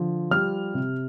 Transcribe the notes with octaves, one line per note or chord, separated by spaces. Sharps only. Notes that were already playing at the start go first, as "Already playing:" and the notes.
Already playing: D3 F3
G3 F6
C3